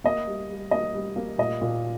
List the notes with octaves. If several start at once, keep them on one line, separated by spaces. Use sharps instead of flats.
A#3 D#5
G3
G3
A#3 D#5
G3
A#3
A#2 D#5
A#2